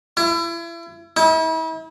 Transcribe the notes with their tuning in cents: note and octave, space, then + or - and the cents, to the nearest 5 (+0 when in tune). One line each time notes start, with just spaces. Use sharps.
E4 +35
E4 -40